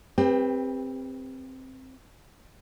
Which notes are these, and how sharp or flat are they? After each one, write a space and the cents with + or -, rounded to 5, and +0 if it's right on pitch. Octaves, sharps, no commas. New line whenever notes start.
C4 +5 G4 +30 B4 -15